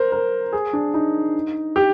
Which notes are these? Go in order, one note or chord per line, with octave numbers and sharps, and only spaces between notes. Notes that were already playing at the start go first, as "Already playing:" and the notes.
Already playing: A#4 C5
A#4
G#4
D4
D#4
G4